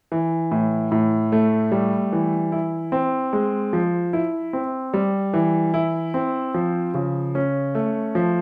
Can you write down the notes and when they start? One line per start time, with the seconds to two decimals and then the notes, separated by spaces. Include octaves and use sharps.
0.12 E3
0.51 A2
0.92 A2
1.32 A3
1.72 G3
2.13 E3
2.52 E4
2.92 C4
3.33 G#3
3.73 F3
4.13 E4
4.53 C4
4.94 G3
5.34 E3
5.74 E4
6.14 C4
6.54 F3
6.94 C#3
7.35 C#4
7.75 A3
8.15 F3